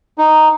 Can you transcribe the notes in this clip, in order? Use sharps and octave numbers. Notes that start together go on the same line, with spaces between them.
D#4